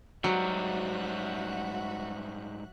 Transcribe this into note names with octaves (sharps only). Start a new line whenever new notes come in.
G#2 F#3 G3 F#4 E5 F#6